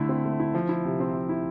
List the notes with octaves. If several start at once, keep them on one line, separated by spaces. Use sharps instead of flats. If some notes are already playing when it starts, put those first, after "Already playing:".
Already playing: D3 A3 E4
C4
A3
E4
F3
E4
C3
C4
F3
E4